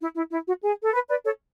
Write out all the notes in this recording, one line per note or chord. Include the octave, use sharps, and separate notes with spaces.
E4
E4
E4
F#4
G#4
A4
B4
B4 D5
A4 C#5